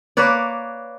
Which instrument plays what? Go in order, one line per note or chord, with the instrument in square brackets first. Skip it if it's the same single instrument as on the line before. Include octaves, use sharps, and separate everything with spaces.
[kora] A#3 B4 C#5 D5